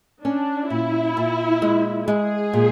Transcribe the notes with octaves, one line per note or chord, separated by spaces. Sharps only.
C#4 D4
A#2 E4
A#2
G#3
G#3 G#4
A#2